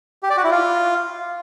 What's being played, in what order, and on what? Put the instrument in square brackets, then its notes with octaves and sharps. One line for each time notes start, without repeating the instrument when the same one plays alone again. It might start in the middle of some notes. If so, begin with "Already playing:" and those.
[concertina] G4
D5
F#4
E4
F4